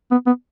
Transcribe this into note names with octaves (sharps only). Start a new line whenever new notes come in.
B3
B3